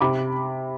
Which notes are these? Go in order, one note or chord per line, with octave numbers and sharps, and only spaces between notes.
C3 B5 D6